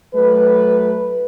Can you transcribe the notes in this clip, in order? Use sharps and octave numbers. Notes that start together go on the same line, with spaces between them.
F#3 A3 B4